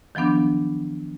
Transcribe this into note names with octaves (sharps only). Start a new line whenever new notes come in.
D#3 F3 F#3 B3 D4